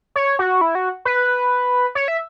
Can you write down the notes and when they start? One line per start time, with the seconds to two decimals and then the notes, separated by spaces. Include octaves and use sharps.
0.16 C#5
0.39 F#4
0.61 E4
0.75 F#4
1.05 B4
1.95 C#5
2.08 E5